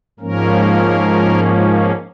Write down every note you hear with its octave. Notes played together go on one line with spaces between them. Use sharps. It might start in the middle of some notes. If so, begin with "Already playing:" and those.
G#2 F3 A#3 C#4 A#4